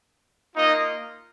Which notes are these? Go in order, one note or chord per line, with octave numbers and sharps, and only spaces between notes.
A#3 D#4 F4 D#5